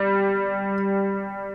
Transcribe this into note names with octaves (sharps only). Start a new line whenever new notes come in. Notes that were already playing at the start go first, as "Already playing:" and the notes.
Already playing: G3